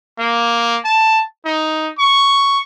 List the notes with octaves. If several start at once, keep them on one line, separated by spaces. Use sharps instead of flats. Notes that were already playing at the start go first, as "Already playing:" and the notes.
A#3
A5
D#4
C#6